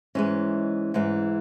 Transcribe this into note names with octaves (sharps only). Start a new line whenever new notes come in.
G#2 E3 G#3 C#4
G#2 E3 G#3